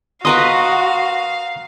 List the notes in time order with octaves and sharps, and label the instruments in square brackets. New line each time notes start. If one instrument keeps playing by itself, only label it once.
[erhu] F#4 [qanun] A#4 B4 D#5 [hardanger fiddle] F5 [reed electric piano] A#5 C6 D#6